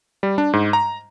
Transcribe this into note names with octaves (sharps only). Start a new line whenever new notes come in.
G3
D4
G#2
A#5